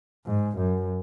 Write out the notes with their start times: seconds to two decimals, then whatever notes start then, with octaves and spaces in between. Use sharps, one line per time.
0.26 G#2
0.58 F#2